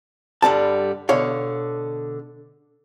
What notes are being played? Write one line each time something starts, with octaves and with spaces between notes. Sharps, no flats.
G2 D3 G3 A5
B2 D3 C#5 F5